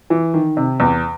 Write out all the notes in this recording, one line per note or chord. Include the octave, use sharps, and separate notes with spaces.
E3
D#3
C3
E2